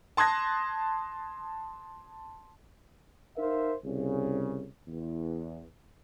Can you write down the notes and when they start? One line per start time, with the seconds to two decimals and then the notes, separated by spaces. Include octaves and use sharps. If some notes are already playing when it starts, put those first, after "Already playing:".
0.17 A5 C6 D#6 F#6 G#6 A#6
3.37 D#4 A#4 C5 E5 F5
3.85 C2 C#3
4.88 E2